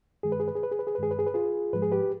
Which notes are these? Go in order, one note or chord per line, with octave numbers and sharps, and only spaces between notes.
G2 D#3 G#3 G#4
B4
G#4
B4
G#4
B4
G#4
B4
G#4
B4
G2 D#3 G#3 G#4
B4
G#4
B4
F4 G#4
G#2 F3 G#3 B4
G#4
G4 B4